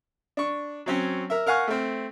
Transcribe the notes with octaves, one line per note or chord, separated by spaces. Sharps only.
D4 C#6
F#3 C4 C#4
A#4 E5
A#4 F5 F#5 G#5 C#6
A3 C4